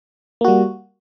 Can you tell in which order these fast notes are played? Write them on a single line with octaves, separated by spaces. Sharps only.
A#3 F#4 G3